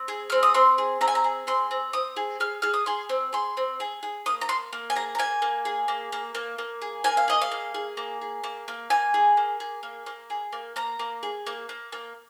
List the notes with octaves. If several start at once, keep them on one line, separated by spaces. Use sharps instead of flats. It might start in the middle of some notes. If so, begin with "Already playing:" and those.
Already playing: C4
G#4
C4 F6
D#6
C4 C6
G#4
C4 A#5
G#5
A#5
G#4
C4 C6
C4
C4 D#6
G#4
G#4 F6
G#4 F6
D#6
G#4 C6
C4
G#4 C6
C4
G#4
G#4
A#3 D#6
A#5
A#3 C6
A#3
G#5
G#4 A#5
A#5
A#3 G#5
A#3
G#4
A#3
A#3
A#3
A#3
G#4
A#3 G#5
F5
G#4 D#5
F5
A#3
G#4
A#3
G#4
A#3
A#3
A#3 G#5
G#4
A#3
G#4
A#3
A#3
G#4
A#3
A#3 A#5
A#3
G#4
A#3
A#3
A#3